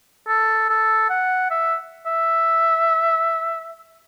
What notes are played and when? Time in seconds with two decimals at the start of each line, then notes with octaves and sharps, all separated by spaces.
0.28 A4
0.69 A4
1.10 F#5
1.51 E5
2.06 E5